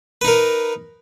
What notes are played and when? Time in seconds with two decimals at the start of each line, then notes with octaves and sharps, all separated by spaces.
0.21 B4
0.25 D#4
0.28 A#4